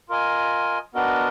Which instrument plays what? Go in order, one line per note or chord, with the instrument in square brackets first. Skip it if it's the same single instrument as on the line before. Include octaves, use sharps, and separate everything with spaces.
[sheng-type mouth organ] F4 A#4 D#5 G#5
B3 D4 F#4 A#4 D#5